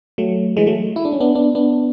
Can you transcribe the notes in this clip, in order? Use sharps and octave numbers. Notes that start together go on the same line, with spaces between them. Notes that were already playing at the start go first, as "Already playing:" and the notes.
F#3 A3
E3 G#3
F#3 A3
E4
D4
C#4
B3 D4
B3 D4
B3 D4